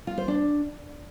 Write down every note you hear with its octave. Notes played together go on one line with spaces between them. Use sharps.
F4
C5
D4